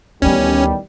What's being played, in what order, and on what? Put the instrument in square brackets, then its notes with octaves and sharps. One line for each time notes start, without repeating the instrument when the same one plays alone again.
[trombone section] A1 D#3 G3 [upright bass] D2 B3 [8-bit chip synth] C#4